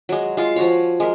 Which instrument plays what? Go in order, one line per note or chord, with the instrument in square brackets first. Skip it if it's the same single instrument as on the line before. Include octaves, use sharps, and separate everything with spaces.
[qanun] F#3 G#3
G#3 F4 F5
F3 F#4 C#5
G#3 A#4